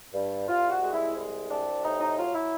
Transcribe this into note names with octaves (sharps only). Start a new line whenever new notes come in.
G2
C2 F4
F#4
G#3
E4
C2
C3 D4
A2 D#4
D#4
F#3 F4
E4